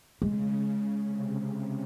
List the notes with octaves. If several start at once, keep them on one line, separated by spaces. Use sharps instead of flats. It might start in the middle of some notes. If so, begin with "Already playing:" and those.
C#3 G#3
C3